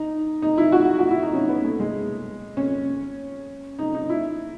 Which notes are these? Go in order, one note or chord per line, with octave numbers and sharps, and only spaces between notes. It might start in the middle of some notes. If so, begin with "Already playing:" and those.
Already playing: D#4
D#4
E4
F#4
F#4
E4
D#4
C#4
B3
A3
G#3
C#4
D#4
D#4
E4